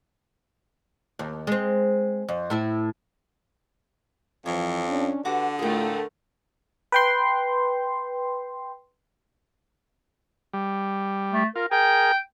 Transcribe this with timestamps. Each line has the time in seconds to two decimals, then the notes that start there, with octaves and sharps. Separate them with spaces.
1.19 D#2
1.47 G#3 C4
2.29 F2
2.50 A2 E4 E5
4.46 F2 E3 F3 C#5
4.87 C#4 D4
5.25 D3 F#4 G4 B4 F#5 D6
5.59 A2 A3 F4 G#4 A#4 G5
6.92 B4 G5 C6
10.53 G3
11.33 A3
11.56 F4 A#4
11.71 G#4 A#4 G5